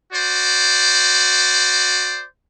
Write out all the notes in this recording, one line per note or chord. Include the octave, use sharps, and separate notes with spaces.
F#4 C5 D5